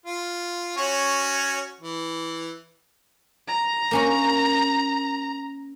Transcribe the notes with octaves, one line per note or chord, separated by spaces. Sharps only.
F4
C#4 F#4 C#5
E3
A#5
A#3 C#4 F#4